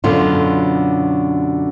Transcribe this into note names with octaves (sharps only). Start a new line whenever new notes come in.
F#2 B2 D3 B3 F4